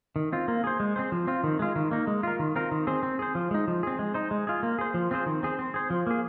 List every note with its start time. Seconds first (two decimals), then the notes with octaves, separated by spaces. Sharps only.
0.16 D#3
0.32 C4 F4
0.48 A#3
0.64 G#4 C5
0.80 G#3
0.96 C4 G#4 C5
1.12 F3
1.27 C4 F4
1.44 D#3
1.59 G#3 F4
1.76 D#3
1.91 A#3 D#4
2.07 G#3
2.23 F4 A#4
2.39 D#3
2.56 C4 F4 A#4
2.71 D#3
2.87 C4 G#4 C5
3.03 C4
3.19 G#4 C5
3.35 F3
3.51 G#3 D#4
3.68 F3
3.83 C4 G#4
3.99 G#3
4.14 D#4 C5
4.31 G#3
4.47 F4 G#4
4.63 A#3
4.79 G#4 C5
4.94 F3
5.11 C4 F4 G#4 C5
5.26 D#3
5.43 C4 G#4 C5
5.59 C4
5.74 G#4 C5
5.90 F3
6.07 A#3 G#4